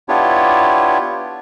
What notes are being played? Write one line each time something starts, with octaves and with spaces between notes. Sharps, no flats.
B3 D4 E4 F4 G4 C#5